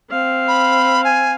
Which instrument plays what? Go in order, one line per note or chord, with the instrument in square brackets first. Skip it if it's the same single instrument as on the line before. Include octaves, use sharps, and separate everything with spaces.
[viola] C4 F5
[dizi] B5
G#5